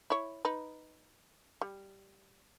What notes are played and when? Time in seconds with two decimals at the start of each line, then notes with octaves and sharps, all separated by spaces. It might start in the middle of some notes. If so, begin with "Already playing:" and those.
0.10 E4 C#5
0.45 D#4 B4
1.61 G3